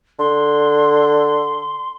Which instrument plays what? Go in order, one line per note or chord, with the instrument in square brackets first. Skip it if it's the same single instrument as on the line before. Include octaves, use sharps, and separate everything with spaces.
[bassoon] D3 [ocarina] C6